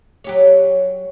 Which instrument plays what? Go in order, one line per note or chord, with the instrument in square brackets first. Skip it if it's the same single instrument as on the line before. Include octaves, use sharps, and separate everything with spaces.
[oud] F#3 G4 C#5